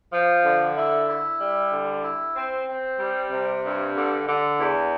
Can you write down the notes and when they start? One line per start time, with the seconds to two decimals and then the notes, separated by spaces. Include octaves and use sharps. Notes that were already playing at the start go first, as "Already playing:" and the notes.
0.11 F3
0.43 D3
0.76 E4
1.08 E4
1.39 G3
1.71 D3
2.03 E4
2.34 C4
2.67 C4
2.99 G3
3.30 C3
3.63 G2
3.95 D3
4.27 D3
4.59 E2